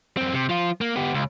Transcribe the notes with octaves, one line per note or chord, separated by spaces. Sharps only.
F#2 C4
C3
F3 F4
A#3
B3 G4
C#2